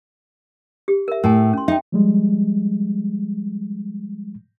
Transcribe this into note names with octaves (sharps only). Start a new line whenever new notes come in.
G4
A#4 E5
A2 A#4 G#5
C#4 C6
D#4 E5 G5
F3 G3 G#3